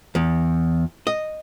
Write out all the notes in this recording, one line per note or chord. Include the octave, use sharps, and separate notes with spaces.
E2
D#5